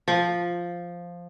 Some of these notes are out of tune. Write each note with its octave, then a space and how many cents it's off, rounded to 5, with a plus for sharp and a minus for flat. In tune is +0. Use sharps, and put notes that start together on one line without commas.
F3 +0